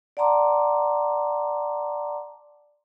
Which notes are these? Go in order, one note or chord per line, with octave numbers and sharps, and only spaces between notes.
D5 F#5 A5 A#5 C6 D6